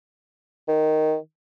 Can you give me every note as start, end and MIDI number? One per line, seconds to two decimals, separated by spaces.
0.68 1.16 51